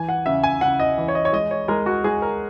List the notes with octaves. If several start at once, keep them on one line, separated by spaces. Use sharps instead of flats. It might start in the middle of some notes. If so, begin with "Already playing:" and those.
Already playing: E3 G#5
F#5
C#3 E5
G#5
C#3 F#5
D#5
E3
C#5
D#5
C#5
G#3 D#5
C#5
G#3 A#4
F#4
G#3 G#4
A#4